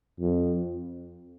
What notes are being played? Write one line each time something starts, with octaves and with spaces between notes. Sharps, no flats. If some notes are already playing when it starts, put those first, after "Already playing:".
F2